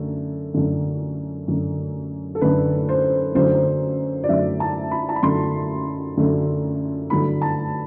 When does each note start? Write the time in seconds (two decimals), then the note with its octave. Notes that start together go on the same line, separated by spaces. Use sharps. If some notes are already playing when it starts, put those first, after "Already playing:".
Already playing: F#2 D3 A3
0.54 F#2 D3 A3
1.48 F#2 D3 A3
2.35 A4
2.41 F#2 D3 A3 B4
2.89 C5
3.35 F#2 D3 F#3 A3 C5
4.24 D5
4.28 F#2 D3 F#3 A3 E5
4.60 A5
4.91 B5
5.09 A5
5.16 B5
5.23 F#2 D3 F#3 A3 C6
6.17 F#2 D3 F#3 A3
7.10 G2 D3 F#3 A3 B5
7.42 A5